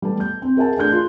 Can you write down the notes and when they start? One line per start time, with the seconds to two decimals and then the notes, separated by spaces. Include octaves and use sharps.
0.02 G3 A3 B3 A5
0.20 G6
0.42 C4
0.57 G#4 A#4 E5 F#5 G#5 A5
0.77 A3 D4 G#4 F#6 G6
0.92 F4